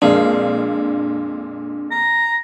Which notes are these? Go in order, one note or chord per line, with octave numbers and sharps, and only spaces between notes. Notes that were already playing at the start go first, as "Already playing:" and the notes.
F2 A#2 G#3 D4 F5
A#5